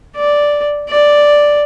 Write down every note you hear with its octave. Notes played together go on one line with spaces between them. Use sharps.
D5
D5